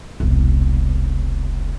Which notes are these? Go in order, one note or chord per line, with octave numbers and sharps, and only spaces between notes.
E1 C2